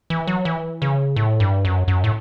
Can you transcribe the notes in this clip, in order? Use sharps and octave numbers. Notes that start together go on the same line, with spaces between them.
E3
F#3
E3
C#3
A2
G2
F#2
F#2
A2